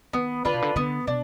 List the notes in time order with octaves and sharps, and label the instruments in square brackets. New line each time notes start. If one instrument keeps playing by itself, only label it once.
[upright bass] D#3 [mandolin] B3
[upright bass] D3 [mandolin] D4 F4 B4
[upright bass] B2
D3
[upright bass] D3 [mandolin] B3
[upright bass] B2 [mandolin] D4